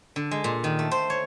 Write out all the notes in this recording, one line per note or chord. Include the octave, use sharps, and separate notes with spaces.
D3
G#3
A#2
D#3
A3
C5
C#5